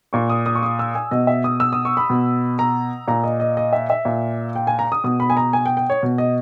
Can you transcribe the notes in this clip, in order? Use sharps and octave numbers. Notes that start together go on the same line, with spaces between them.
A#2 C#6
D#6
D#6
C#6
D#6
E6
G#5
B2 D#5
E5
D#6
E6
D#6
C#6
B5
B2
A#5
A#2 A#5
D#5
D#5
D#5
E5
E5
A#2
G5
G#5
A#5
D#6
B2 D#6
B5
G#5
A#5
G#5
G5
G5
C#5
B2
D#5